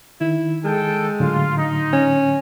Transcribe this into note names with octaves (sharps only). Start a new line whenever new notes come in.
D#3 E4
G#3 A4 G5
A2 D3 F#3 F4
D#4
C#4